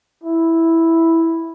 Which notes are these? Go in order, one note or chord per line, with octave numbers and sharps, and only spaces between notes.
E4